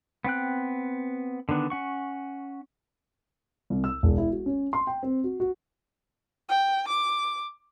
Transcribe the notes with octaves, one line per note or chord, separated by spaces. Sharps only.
B3 C4 G5 F#6
D3 D#3 B3 D4
C#4 F#5 C#6
C2
E6
E1
E4
F#4
C#4
C6
G5
C4
F#4
F#4
G5
D6